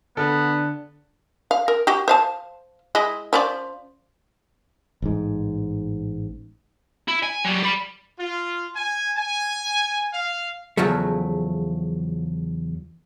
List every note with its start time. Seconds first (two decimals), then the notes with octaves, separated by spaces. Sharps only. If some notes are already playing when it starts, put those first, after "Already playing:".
0.17 D3 B3 A4
1.51 F5
1.68 A#4
1.87 F#4 G4
2.08 C5 F5 A5
2.95 G#3 E4 D#5
3.33 F3 C#4 D5
5.02 A1 G#2
7.08 E4
7.23 G#5
7.45 F#3 G3
7.63 D5 B5
8.19 F4
8.76 G#5
9.17 G#5
10.14 F5
10.77 E2 C#3 F3 F#3 A3